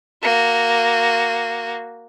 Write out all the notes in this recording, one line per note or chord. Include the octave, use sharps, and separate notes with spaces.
A#3 F#4